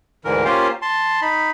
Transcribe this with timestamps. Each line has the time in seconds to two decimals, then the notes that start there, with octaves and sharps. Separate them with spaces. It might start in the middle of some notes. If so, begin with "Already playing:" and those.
0.25 D2 G#2 D3 E3 A#4
0.45 A#3 C#4 F4 G4 C5 F5
0.82 A5 C6
1.22 D#4 B5